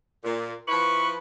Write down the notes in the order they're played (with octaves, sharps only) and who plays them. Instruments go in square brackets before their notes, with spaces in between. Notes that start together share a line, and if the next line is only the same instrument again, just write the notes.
[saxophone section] A#2
[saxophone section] F3 E4 B4 [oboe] C#6